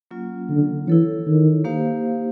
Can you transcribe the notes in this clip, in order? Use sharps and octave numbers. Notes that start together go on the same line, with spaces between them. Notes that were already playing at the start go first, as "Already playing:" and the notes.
F#3 A#3 C#4 F4
D3
E3 E4 A4 C#5
D#3
A#3 D#4 G4 C5 F5